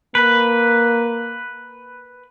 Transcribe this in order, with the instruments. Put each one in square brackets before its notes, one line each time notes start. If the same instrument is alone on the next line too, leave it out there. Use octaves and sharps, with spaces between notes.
[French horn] A#3 [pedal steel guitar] B4